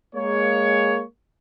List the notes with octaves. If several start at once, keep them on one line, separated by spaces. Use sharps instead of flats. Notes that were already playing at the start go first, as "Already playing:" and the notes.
G#3 A#3 C#5